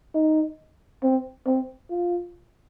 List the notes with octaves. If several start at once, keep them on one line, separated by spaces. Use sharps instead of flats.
D#4
C4
C4
F4